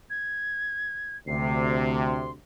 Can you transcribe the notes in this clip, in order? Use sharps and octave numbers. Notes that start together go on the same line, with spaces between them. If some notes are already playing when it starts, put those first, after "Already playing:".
G#6
D2 C3 C7
C6